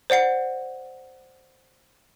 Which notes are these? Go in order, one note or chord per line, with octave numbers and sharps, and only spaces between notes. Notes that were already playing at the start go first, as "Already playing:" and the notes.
C5 D5 F#5 C7